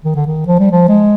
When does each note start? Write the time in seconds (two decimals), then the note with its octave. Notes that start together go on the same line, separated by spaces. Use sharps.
0.04 D#3
0.15 D3
0.26 D#3
0.47 F3
0.59 G3
0.71 F3
0.88 G#3